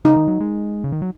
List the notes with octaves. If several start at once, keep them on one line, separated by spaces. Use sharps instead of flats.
C#3 D#4
D#3
F#3
G#3
C#3
D#3
F#3